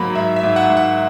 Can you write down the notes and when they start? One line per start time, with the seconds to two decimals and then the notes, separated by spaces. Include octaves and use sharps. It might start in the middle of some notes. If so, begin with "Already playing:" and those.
Already playing: G#2 F#3 A#3 A#5 B5
0.15 G#2 E5
0.36 E5
0.43 G#2
0.56 F#5
0.70 G#2
0.77 F#5